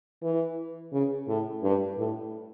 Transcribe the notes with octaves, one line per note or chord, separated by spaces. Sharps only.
E3
C#3
A2
G2
A2